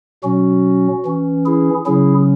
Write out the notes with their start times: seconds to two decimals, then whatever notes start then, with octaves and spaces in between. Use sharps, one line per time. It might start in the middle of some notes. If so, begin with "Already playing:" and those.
0.24 B2 F#3 C#4 F#4
1.05 E3 C#4
1.46 E4 G#4
1.86 C#3 F#3 C#4 E4 G#4